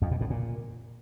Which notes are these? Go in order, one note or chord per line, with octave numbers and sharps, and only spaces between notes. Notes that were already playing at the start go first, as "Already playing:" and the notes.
F2
B2
A2
A#2